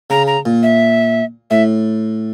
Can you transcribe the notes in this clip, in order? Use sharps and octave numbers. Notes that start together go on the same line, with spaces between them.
C#3 A#5
A#5
A#2
E5
A2 E5